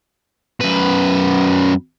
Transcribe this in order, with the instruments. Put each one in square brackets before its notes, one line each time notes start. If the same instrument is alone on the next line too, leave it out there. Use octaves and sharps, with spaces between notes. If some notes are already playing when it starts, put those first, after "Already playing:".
[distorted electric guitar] F#2 B4